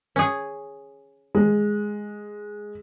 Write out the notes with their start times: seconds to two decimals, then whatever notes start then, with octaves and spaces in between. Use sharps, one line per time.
0.16 C#4 G#4
1.35 G#3